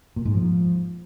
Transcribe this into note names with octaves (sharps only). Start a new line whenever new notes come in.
A#2
G#2
F3